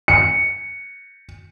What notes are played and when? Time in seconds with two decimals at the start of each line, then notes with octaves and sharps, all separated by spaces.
0.08 C#7